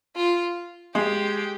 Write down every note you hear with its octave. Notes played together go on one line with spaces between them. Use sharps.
F4
G#3 G4